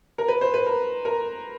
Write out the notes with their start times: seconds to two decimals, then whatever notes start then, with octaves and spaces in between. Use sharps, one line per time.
0.18 A#4
0.28 B4
0.41 C5
0.54 B4
0.66 A#4
1.05 A#4